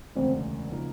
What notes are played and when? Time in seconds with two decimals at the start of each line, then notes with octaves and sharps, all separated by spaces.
0.16 E1 D2 C#3 C4
0.72 C#3 F3 A#3 D#4